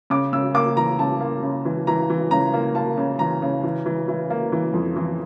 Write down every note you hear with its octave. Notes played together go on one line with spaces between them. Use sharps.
C#3 D6
C#3 E6
A#3 D6
E3 A#5
C#3 A5
A#3
C#3
E3
E3 A#5
E3
C#3 A#5
A#3
A#3 A5
C#3
E3 A#5
C#3
E3
E3
E3
A#3
E3
F2
E3